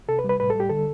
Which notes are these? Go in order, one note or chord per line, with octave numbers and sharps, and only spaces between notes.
C3 A4
B4
G3
B4
A2 B4
A4
G3 G4
D3 A4